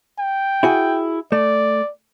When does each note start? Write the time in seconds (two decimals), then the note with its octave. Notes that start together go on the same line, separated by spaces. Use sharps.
0.19 G5
0.63 E4 F#4 G#4
1.32 A3 D5